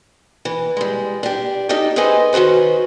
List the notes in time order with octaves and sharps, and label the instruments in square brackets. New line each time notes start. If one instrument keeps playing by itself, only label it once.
[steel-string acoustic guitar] E3
G3 G#3
D4 G4
D#4 G4 A4 D5 D#5
G#4 A4 B4 C5 D#5 G#5
D#3 C#4 F#4 B4 C5